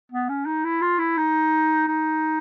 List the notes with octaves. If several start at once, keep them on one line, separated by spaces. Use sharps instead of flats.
B3
C#4
D#4
E4
F4
E4
D#4
D#4